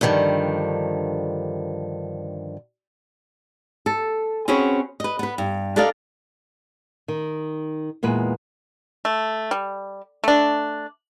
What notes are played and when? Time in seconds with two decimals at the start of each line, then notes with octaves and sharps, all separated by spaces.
0.01 G2 D3 D#3 F3
3.86 A4
4.48 C4 C#4 F#4 G#4 B4 C#5
5.00 B4 D#5
5.19 B3 B4
5.38 G2
5.76 D4 A4 A#4 D5 D#5 F5
7.08 D#3
8.03 E2 A#2 G#3 B4
9.05 A3
9.51 G3
10.24 A3 D4